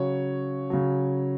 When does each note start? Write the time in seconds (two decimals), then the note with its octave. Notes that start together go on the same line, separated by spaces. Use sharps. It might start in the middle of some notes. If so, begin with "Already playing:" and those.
Already playing: C#3 F#3 C#5
0.70 C#3 F#3